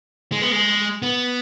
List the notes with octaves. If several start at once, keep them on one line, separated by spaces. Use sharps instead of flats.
G#3
B3
G#3
B3